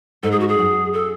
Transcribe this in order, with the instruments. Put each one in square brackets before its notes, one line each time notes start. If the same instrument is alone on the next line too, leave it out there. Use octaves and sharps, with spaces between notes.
[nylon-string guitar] G#2 [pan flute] A4
[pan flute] G#4
F#4
G#4
[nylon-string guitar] F#2
[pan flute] A4